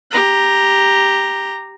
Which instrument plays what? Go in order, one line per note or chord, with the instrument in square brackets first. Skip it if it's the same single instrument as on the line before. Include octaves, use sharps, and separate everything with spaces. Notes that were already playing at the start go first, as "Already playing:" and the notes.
[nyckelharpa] G4 A#5